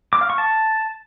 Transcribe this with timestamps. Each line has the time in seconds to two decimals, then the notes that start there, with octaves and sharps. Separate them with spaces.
0.13 D6
0.21 F5
0.30 C#6
0.38 A5